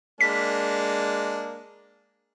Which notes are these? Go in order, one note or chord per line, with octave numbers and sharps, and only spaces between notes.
G#3 A#3 D4 B6